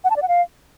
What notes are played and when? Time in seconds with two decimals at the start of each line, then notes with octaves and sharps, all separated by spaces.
0.04 F#5
0.10 A5
0.16 D5
0.22 F#5
0.28 F5